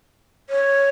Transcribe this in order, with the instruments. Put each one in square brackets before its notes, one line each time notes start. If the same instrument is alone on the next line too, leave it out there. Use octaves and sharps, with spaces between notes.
[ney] C#5